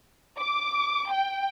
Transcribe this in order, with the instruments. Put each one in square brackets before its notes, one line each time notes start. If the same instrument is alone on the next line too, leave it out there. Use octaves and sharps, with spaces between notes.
[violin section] D6
G5